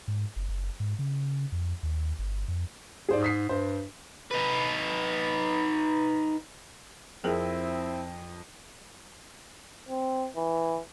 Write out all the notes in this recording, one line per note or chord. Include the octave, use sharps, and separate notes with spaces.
G#2
F#1
F#1
G#2
C#3
F2
D#2
G1
F2
G#2 G#4 C5 D5
D#6 B6 C7
G2 C5
D#4 B4
F2 C4 E4 G#4 A#4
C4
E3